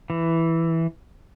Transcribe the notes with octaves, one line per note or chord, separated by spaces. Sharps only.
E3